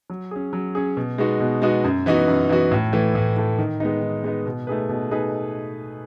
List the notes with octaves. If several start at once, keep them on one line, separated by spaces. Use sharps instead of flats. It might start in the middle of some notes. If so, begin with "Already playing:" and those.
F#3
C#4 G#4
F#3
C#4 G#4
B2
G#3 B3 D#4 F#4
B2
G#3 B3 D#4 F#4
F#2
E3 B3 D#4 F#4
F#2
E3 B3 D#4 F#4
A2
E3 A3
A2
E3 A3
D#3
G#3 B3 D#4
D#3
G#3 B3 D#4
B2
A3 D#4 G#4 B4
B2
A3 D#4 G#4 B4